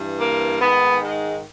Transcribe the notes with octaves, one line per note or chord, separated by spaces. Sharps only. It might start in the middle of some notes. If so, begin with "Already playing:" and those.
Already playing: G2 E3
A#3
G#2 D#3 B3
G#3